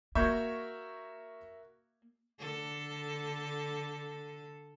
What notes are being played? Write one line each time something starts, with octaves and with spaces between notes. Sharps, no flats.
A#3 F#4 A#4 E5 C#6 G6 G#6
D3 A4